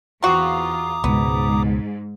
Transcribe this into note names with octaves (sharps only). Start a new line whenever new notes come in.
E2 C4 F4 F#4 A#5 D6 D#6
C#2 G#2 B2 B3